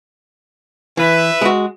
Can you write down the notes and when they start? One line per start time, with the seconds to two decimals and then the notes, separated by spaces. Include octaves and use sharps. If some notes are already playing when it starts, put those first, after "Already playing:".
0.97 E3 B4 E5
1.41 G#3 F#4